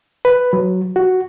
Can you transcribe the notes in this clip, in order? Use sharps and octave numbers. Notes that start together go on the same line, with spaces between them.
B4
F#3
F#4